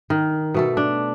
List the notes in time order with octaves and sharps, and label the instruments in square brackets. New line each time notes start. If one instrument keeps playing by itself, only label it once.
[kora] D#3
B2 A3 A4
D4